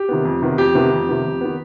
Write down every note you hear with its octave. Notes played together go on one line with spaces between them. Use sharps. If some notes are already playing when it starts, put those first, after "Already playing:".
Already playing: G4
C3 D#3 B3
F2
C3 D#3 B3
F2 G4
C3 D#3 B3
F2
C3 D#3 B3
F2
D#3 B3